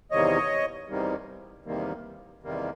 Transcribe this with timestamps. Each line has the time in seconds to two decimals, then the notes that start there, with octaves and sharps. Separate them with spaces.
0.11 E2 C3 D#3 G3 A#3 C#5 D#5
0.88 E2 C3 D#3 G3 A#3
1.65 E2 C3 D#3 G3 A#3
2.42 E2 C3 D#3 G3 A#3